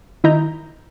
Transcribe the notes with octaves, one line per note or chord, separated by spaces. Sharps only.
D#3 E4 D#5 A#5 G6